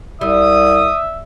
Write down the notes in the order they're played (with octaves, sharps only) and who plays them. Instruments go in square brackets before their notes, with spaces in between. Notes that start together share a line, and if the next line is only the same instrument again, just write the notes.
[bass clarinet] C2 [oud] G3 [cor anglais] E5 [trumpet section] D#6